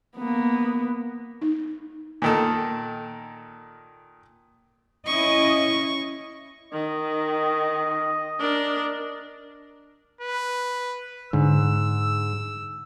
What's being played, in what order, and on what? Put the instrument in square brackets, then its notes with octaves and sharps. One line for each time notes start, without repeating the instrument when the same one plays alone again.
[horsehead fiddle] A#3 B3
[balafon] D#4
[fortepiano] A#2 D#3 A4
[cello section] C#4 E4 D#5 [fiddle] C#6
[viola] D#3 [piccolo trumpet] D#5
[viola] D4 A#4
[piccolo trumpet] B4
[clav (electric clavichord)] G#2 [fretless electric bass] D3 [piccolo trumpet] E6